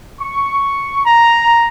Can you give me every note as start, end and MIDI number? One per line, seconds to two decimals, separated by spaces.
0.20 1.02 85
1.04 1.68 82